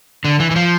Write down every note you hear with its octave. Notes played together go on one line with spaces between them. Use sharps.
D3
E3
E3
F3